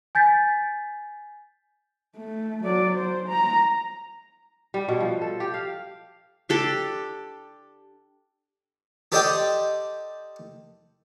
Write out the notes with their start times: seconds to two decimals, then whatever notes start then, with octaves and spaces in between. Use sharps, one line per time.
0.15 G#5 G6 A6 B6
2.17 A3
2.63 F#3 D5
2.96 C5
3.29 A#5
4.74 G3
4.88 B2
5.01 F3
5.22 A4
5.40 G4
5.54 F5
6.49 D4 G4 A4
9.12 G4 A4 C5 D5 D#5 G5